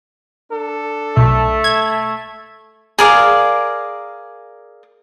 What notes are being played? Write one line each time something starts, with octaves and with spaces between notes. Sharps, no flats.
D4 A4
B1 A3
G#6
G#4 A#4 D5 F5